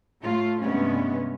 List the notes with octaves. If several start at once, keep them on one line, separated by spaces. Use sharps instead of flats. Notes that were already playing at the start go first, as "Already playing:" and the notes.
A2 A3 F4
G2 C3 G#3 A3 B3 C#4